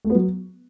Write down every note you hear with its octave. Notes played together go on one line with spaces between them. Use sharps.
A3
B3
F#3